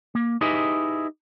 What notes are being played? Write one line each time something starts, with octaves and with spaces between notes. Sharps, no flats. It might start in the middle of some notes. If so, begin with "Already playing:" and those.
A#3
D#4 E4 G4 G#4 B4 D#5